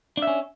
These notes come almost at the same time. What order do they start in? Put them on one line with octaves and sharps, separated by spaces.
D4 E5 C#4